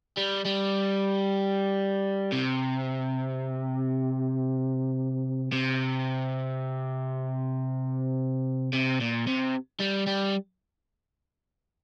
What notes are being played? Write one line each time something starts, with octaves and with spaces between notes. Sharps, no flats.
G3
G3
C3
C3
C3
A#2
C3
G3
G3